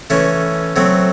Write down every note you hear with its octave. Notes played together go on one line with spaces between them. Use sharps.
E3 A3 C#4
F#3 A3 C4